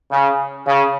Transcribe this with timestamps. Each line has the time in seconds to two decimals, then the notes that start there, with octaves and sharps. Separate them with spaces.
0.11 C#3
0.67 C#3